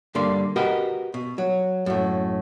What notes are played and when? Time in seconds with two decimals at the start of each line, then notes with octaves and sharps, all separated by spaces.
0.15 G2 D3 A#3 D5 C6
0.56 F#4 G4 A#4 B4 D#5
1.14 B2
1.38 F#3
1.86 F#2 A2